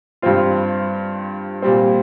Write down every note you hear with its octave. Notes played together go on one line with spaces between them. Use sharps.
G2 G3 C4 F4
A#2 G3 C4